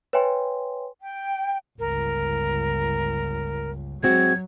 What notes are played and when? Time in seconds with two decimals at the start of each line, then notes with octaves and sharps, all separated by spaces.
0.13 B4 C#5 E5 G5 G#5 C6
1.01 G5
1.79 G1 C#2 A#4
4.03 F#3 G#3 C4 F#4 G#6